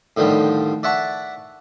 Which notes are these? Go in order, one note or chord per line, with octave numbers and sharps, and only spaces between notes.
A2 D3 D#3 F3 G3
D5 E5 F#5 A5 C#6